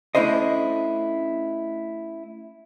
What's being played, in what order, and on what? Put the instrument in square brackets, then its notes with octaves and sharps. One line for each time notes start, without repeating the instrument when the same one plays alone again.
[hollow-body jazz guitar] A3 C#4 D4 E4 C5 D#5